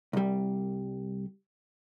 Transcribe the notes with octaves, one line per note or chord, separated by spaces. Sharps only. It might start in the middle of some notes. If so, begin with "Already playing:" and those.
C2 G3